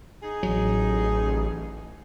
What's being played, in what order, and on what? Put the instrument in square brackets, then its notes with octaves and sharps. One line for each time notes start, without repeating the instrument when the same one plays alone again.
[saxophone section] D#4 G#4
[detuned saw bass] A1 [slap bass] F#3